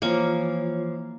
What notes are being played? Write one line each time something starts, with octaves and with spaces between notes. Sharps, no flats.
E3 F3 A#3 F4 C#5